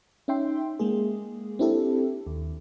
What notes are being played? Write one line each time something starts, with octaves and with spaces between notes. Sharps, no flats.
C#4 D#4 E5 G5 C6
G#3 A#3 G#4
C4 D4 E4 G4 A4
D#2